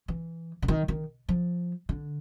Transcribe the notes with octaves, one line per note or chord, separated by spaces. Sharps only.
E3
D3
D#3
D#3
F3
D3